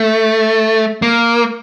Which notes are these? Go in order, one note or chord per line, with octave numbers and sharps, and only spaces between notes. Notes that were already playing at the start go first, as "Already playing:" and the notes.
Already playing: A3
A#3